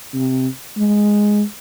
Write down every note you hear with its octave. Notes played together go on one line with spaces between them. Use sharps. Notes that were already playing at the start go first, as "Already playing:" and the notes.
C3
G#3